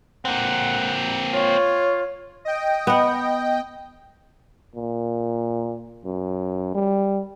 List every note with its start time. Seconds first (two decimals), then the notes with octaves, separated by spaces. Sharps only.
0.25 A#3 C4 F#5
1.33 F4 C#5
2.45 D#5 G5
2.87 B3 F#5
4.76 A#2
6.05 F#2
6.75 G3